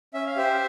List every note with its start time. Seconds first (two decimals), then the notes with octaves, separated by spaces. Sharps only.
0.14 C#4 E5
0.26 F5
0.36 G4 C5 E5